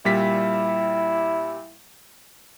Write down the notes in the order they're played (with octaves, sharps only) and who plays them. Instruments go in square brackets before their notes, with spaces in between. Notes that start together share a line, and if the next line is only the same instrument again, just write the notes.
[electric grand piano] A#2 G3 B6 [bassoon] E4